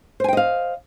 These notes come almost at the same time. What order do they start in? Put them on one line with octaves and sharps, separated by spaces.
C5 G#5 G5 D#5 F5